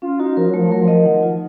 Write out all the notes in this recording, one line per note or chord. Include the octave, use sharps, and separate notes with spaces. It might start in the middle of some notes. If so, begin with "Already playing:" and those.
C#4 F4
D#4 F#4
F3 A#4
F#3
F3 A3
F#3 A#4
F3
D#5
D#3 F#5
F4